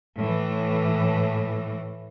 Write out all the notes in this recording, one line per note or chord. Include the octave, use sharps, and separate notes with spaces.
A2 E3